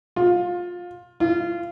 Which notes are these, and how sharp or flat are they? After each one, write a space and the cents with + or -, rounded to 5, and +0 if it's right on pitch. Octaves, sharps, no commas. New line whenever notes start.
F4 +20
F4 -20